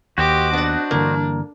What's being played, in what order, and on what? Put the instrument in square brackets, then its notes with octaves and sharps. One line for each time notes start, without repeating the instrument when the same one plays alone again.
[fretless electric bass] D#2 [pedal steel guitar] F#4 C5 D#5 [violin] G4 D6
[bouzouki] B3 F#5 [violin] D4
[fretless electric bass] G2 D3 E3 [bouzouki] A#3